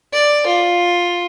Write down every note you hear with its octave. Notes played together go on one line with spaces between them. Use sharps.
D5
F4